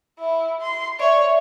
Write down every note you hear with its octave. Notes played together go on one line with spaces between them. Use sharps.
E4
C6
C#5 D5 E5